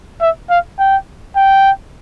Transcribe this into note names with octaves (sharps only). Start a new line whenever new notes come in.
E5
F5
G5
G5